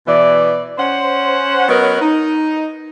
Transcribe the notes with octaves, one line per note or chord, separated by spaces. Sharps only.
B2 E3 D5
C#4 C5 F#5
F#3 B3 C#4 A#4 B4 D#5
D#4